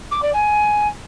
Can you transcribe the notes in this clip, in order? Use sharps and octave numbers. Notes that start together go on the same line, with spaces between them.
D6
D5
G#5